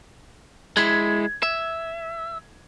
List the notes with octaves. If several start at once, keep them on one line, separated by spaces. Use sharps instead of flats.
G#3 E4 G#6
E5